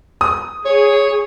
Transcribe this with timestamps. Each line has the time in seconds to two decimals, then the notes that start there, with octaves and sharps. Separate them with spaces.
0.21 D#6
0.66 G#4 C#5